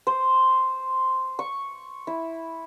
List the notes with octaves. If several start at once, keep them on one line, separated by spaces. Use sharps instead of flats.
C5
C#6
E4